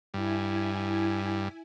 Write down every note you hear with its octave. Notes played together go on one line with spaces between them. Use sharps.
G2 E4 G#5